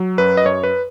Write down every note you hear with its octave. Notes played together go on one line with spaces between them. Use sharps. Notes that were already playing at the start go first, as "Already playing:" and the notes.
Already playing: F#3
F#2 B4
D#5
F#2 C#5
B4